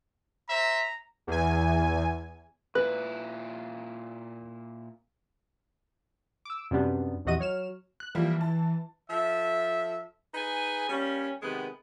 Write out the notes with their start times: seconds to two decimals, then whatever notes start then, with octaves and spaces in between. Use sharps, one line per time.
0.50 C5 E5 A#5
1.27 E2 G#5
2.75 A#2 E4 B4 F#6
6.45 D6 E6
6.71 F#2 C3 G3 B3 D4
7.25 A#1 E2 C3 F#4 D#5 D#7
7.40 F#3 C#5 F6 E7
8.00 F#6
8.15 E3 F3 G3 A#3
8.41 A5
9.10 F3 A4 E5
10.34 D#4 G#4 B4 G#5
10.89 G3 A#3 C#4
11.42 C3 D#3 G#3 B3